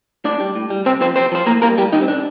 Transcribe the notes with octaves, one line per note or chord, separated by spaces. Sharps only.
A2 D4 D5
G3
A2
G3
C3 C4 C5
F3 C4 C5
C3 C4 C5
F3 C5
A2 A#3 A#4
G3 A#3 A#4
A2 G3 G4
D#3 G3 D#4
C4
C3 D4